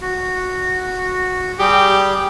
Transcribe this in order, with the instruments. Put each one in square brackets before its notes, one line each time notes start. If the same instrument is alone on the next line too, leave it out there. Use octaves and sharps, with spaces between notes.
[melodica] F#4
[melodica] G3 G#4 [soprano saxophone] G4